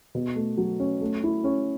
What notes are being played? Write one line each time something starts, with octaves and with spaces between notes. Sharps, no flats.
B2
A3
F#3
C#4
A3
E4
C#4